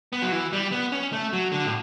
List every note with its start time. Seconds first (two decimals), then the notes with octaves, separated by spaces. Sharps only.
0.13 B3
0.22 F#3
0.32 E3
0.53 G3
0.72 B3
0.92 C#4
1.13 A3
1.33 F#3
1.52 D3
1.65 A2